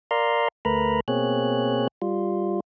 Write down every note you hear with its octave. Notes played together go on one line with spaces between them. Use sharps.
A#4 D5 F5 A#5 C6
D2 A3 A#4 B4 A#5 B5
B2 A#3 C4 G#4 C#5 F#6
G3 F4